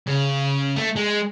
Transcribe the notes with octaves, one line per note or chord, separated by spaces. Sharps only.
C#3
A3
G#3